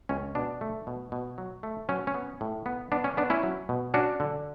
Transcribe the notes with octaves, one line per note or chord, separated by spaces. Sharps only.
C#2 C#4
B2 D4
A3
B2
B2
F#3
A3
F#3 C#4
C#4
B3
A2
B3
B3 D4
C#4
B3 D4
C#4 E4
F#3
B2
C#4 D4 F#4
D3